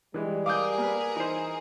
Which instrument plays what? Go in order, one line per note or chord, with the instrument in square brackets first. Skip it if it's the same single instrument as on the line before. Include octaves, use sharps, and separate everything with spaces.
[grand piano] E3 G#3 [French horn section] G3
[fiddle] G#4 A#4 [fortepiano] F5 [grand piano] D6 D#6 G6
[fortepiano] A#3 B4
[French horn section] E3 [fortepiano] D#4 C5